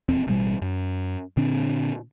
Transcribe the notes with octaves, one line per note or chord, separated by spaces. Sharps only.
D#1 E2 C4
A1 B2 G3
F#2
A#2 D3 C4 D4